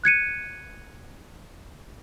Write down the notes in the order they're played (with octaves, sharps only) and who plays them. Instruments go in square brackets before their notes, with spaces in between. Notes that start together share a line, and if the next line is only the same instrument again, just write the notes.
[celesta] F#6 G#6 C#7 D#7